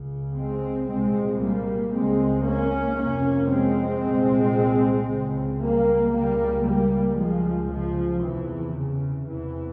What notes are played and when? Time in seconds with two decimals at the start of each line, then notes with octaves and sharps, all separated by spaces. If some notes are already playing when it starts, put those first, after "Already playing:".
Already playing: C#2 C#3
0.35 G#3 C4
0.88 C2 A#2 G#3 C4
1.41 G3 A#3
1.94 C#2 C#3 G#3 C4
2.46 A#3 C#4
2.98 F2 C3 A#3 C#4
3.50 G#3 C4
4.03 C2 A#2
5.08 C#2 C#3
5.61 G3 A#3
6.13 C#2 C#3 G3 A#3
6.66 G3 A#3
7.18 C#2 C#3 F3 G#3
7.71 C#3 F3
8.24 E2 C3 E3
8.76 C#3
9.28 E2 C3 E3